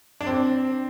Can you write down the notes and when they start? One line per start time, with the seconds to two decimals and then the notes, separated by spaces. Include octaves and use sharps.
0.21 D4
0.27 C4